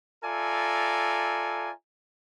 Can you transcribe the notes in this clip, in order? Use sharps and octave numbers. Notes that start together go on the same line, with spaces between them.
F4 A4 D5 E5 G#5 A#5